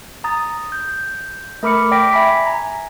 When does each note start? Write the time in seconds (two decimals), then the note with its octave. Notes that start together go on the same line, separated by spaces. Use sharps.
0.24 A#5 D#6 A6
0.72 G6
1.63 A3 A#4 B5 D6 F6 C#7
1.91 D5 G5 D6 A#6 B6 D7
2.13 E5 G#5 B5 B6
2.45 G#5 A#5